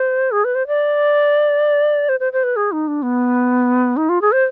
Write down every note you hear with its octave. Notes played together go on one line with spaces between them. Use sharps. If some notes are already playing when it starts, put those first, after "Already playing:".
Already playing: C5
G#4
B4
C5
D5
C5
C5
C5
B4
G#4
D#4
D4
B3
D#4
F4
G#4
C5